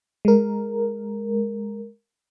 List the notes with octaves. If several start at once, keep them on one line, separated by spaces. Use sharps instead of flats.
G#3 A#4